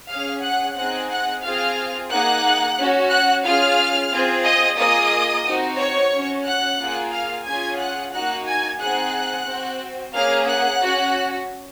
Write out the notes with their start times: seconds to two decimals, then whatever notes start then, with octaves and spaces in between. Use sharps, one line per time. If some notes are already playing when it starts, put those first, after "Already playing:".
0.09 C#4 G#4 F5 F6
0.43 F#5 F#6
0.76 C4 D#4 G#4 F#5 F#6
1.10 F#5 F#6
1.43 C4 F4 G#4 F5 F6
2.10 A#3 D#4 G#4 F#5 F#6
2.77 C#4 F#4
3.11 F#5 F#6
3.44 C#4 F4 G#4 F5 F6
4.11 C4 F4 G#4
4.45 D#5 D#6
4.78 A#3 F4 G#4 D#5 D#6
5.46 C4 D#4 F#4
5.78 C#5 C#6
6.12 C#4 F#4
6.45 F#5 F#6
6.79 A#3 F4 G#4
7.12 F5 F6
7.46 C#4 F4 G#4 G#5 G#6
7.79 F#5 F#6
8.13 A#3 D#4 F#4 F#5 F#6
8.47 G#5 G#6
8.79 C4 D#4 G#4 F#5 F#6
9.47 C4 F#4
10.14 A#3 C#4 G#4 F5 F6
10.47 F#5 F#6
10.81 C#4 F#4